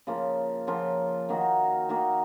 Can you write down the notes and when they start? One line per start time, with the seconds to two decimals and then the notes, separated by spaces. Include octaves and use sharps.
0.07 C#3 F3 A#3 F4
0.67 C#3 F3 A#3 F4
1.29 D#3 A#3 D#4 F#4
1.89 D#3 A#3 D#4 F#4